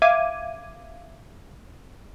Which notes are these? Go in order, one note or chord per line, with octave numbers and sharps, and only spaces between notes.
E5 F5 D6 G#6 D#7